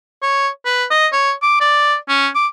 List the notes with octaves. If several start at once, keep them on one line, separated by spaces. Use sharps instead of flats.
C#5
B4
D#5
C#5
D6
D5
C#4
D6